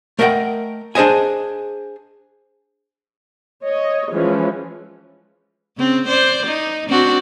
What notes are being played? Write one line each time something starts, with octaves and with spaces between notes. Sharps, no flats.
A3 A#4 D#5 E5 F#5 G5
D4 G#4 C5 D#5 G#5
C#5 D#5
E3 F3 G#3 C#4
C#3 C4
C5 D5
D#4
C4 D4 F#4